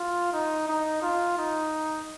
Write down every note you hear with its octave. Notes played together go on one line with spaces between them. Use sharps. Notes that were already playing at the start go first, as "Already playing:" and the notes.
Already playing: F4
D#4
D#4
F4
D#4